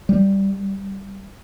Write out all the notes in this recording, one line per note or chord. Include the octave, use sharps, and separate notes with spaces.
G3